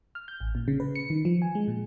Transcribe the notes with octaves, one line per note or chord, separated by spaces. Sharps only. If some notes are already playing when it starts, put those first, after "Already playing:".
F6
G6
A1
A#2
C#3
B4
C#7
D#3
F3
G#5
G#3
A#2